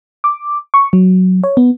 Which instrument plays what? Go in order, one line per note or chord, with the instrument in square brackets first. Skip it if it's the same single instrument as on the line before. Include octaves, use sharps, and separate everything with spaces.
[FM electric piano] D6
C#6
F#3
C#5
B3